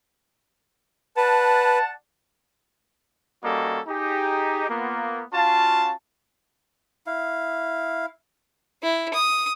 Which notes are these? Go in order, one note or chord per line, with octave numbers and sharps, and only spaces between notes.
B4 D5 F#5 A5
G3 A#3 C#4 F#4 A4 D#5
D#4 G4 G#4
A#3 B3 F4
C#4 F4 F#4 F5 A5
E4 F5
E4
D#6